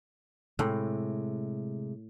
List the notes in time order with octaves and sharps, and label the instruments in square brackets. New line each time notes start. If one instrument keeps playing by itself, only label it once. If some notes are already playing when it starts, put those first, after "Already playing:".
[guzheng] A2 [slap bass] C3 G#3